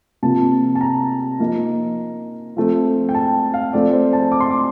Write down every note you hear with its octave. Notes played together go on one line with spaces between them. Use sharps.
C3 F3 A#3 F4 A5
A5
A#5
F3 A#3 D#4
F3 A3 C4
G5
A5
F5
F3 A3 C4 D5
C5
A5
D6
C6
D6